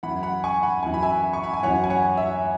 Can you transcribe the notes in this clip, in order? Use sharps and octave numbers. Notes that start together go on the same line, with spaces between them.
F#2 E3 F#5 B5
F#5 B5
G#5 C#6
F#5 B5
F#2 E3 G#5
B5
E5 G#5
C#6
B5
G#5
F#2 E3 C#5 F#5
G#5
C#5 F#5
E5